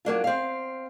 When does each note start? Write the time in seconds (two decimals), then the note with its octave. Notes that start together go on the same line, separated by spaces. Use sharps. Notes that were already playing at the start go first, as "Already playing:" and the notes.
0.05 F#3 A#3 D4 F4
0.24 C4 F5